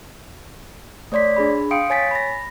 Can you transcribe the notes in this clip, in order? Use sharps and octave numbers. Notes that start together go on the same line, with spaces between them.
A3 C#5 D5 C6 B6
D4 G#4 B5
F5 G5 C6 D#6 C#7 D7
C#5 G#5 A6 B6
B5 A#6